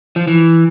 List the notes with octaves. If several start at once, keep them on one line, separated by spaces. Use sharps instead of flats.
F3
E3